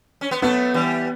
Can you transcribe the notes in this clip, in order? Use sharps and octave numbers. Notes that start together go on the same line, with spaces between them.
C#4
B3
F#3 A3 B3
E3 G3